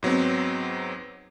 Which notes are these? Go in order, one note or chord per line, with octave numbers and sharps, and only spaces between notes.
G#2 F#3 B3 C4